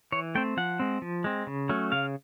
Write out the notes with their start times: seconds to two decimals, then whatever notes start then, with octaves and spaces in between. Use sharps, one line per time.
0.12 E3 C#5
0.35 A3 C4 G5
0.57 F3 F#5
0.80 G#3 C4
1.02 F3
1.24 G#3 C4
1.47 C#3
1.69 F#3 A3 C#4
1.92 C#3 F5